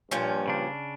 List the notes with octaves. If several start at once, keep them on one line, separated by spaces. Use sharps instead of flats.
G2 A#2 F3 C#4
C#3 D4